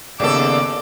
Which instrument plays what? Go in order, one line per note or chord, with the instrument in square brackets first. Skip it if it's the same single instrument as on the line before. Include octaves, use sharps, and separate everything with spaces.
[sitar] D#2 A4 [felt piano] C#3 A#3 B3 [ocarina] D5 [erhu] D6